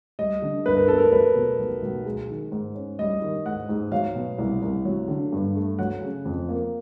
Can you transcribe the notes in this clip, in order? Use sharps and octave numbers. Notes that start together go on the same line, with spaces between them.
G3 D#5
D3
G2 B4
A#4
B3 A4
A#4
F#3 B4
B2
B1
B1
G#3
D#3
G#2
C#4
G3 D#5
D#3
G#2 F#5
G#2
F#3 F5
B2
C2
C2
F#3
D3
G2
A3
F#3 F#5
C#3
F2
A#3